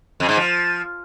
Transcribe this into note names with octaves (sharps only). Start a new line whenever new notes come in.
F2
G#2
F3